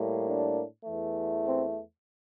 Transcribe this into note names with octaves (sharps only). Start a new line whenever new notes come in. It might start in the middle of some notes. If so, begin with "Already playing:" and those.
Already playing: A2 G3 A#3
D4
E2 E3 A3
C4